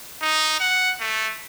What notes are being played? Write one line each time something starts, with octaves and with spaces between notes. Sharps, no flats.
D#4
F#5
A3